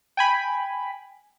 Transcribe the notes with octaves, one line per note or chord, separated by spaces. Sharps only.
G5 G#5 B5